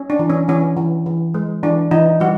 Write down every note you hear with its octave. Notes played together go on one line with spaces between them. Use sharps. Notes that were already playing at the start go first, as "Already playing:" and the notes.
Already playing: C#4
D4
E3
C#4
E3 C#4
E3
E3
G#3
E3 D4
E3 D#4
G3 F#4